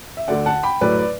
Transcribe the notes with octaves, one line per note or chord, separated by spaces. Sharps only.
E5
D2 D3 A3 D5 F#5
F#5 A5
G5 B5
A2 F#3 A3 B4 D5
D5